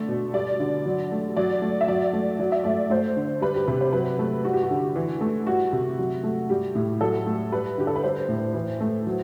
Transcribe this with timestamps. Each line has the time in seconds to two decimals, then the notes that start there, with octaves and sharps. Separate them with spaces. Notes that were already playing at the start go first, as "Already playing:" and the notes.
Already playing: D3 A3 D5
0.08 B2
0.34 G3 D5
0.60 D3
0.86 F#3
1.12 A3
1.36 F#3 D5
1.62 A3
1.81 E5
1.88 F#3 D5
2.13 A3
2.39 F#3 D5
2.52 E5
2.64 A3 D5
2.90 A3 C5
3.16 D3
3.41 G3 B4
3.55 G4
3.68 C3 B4
3.81 C5
3.93 F#3 B4
4.19 A3
4.45 G3 F#4
4.53 G4
4.63 F#4
4.71 D3
4.96 E3
5.21 A3
5.47 G3 F#4
5.73 C3
5.99 F#3
6.23 A3
6.50 G3 G4
6.75 A2
7.01 F#3 A4
7.26 A3
7.52 G3 B4
7.78 D3 G4
7.87 A4
7.96 B4
8.03 G3 C5
8.29 A2
8.54 E3
8.81 A3
9.07 F#3